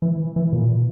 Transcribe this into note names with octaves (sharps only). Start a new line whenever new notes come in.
E3
E3
A#2